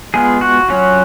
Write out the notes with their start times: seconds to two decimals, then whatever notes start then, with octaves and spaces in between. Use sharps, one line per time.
0.14 G#3 B3 F4 G#4
0.41 F#4
0.69 F#3 C#4 F4